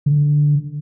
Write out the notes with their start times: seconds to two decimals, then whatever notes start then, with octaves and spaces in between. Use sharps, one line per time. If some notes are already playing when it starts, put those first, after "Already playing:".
0.06 D3